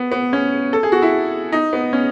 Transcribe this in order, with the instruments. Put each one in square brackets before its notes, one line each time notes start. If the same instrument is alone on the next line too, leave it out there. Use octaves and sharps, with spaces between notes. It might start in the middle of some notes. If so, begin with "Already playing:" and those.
Already playing: [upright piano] B3
B3
C#4
A4
G#4
F#4
E4
D#4
B3
C#4